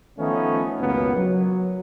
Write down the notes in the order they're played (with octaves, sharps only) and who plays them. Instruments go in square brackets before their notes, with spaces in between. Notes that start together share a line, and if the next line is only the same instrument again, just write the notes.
[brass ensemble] D#3 F3 A3 B3 C#4 D#4
C#2 F#2 B2 D#3 A#3 B3
F#3